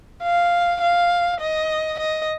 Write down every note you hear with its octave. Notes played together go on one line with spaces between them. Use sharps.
F5
F5
D#5
D#5